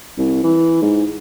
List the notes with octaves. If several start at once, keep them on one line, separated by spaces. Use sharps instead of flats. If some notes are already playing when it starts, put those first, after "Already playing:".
C2
E3
G#2